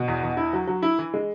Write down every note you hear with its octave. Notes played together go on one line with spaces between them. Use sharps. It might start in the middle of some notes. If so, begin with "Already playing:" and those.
Already playing: B2
E2
E2
E4
F#3
F#3
E4
E3
G#3